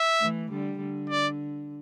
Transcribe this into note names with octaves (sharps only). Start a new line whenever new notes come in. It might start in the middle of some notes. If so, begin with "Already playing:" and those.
Already playing: E5
E3 A3
D3 G3
D3
D5